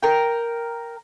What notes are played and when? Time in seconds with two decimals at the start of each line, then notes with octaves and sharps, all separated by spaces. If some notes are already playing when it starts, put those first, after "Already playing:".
0.03 A#4 G5